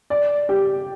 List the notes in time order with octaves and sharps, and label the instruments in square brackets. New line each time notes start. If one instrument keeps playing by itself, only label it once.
[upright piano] D5
G4